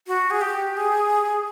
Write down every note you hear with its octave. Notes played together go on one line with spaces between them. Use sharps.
F#4
G#4
G4
G#4